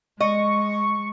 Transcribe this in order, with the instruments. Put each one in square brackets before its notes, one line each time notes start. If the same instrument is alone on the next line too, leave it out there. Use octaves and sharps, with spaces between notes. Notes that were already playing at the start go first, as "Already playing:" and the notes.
[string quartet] G#3 [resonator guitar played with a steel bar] D#5 [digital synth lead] C#6